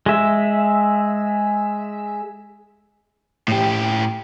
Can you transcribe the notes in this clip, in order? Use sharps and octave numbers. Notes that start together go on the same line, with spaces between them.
G#3 E5
A2 G4